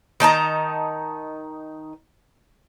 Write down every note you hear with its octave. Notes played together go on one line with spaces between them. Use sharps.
D#3 D#4 A5 A#5